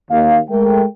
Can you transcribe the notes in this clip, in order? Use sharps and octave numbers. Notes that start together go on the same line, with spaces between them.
D#2 F5
G#3 A3 A#4 G5